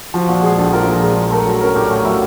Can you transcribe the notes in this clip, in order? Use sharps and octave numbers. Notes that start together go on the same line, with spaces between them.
F3 F#4
A#2 F#4
G#3 G#4
A#1 A4
F3 A#4
A#2 A#4
G#3
A#1
A3 A#4
F#3
C#4 A#4
A2 G4
A3 F#4
F#3 E4